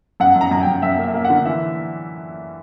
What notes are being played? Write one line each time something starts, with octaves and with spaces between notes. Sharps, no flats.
F#2 F#5
F#2
A#5
F#2 A#5
F#2 G5
F#2 E5
A#3 E5
A#3
F#5
D3
E3 E5